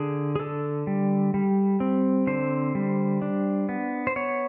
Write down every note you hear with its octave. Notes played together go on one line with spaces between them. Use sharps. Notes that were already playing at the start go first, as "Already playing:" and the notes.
Already playing: D3 G#4
G#4
D3 A4
G3
G3
C4
D3 C5
G3
D4
B3
C5
B3 C#5